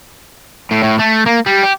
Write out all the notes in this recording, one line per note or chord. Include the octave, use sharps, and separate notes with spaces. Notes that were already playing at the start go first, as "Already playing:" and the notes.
A2
A2
A3
A#3
G3
G4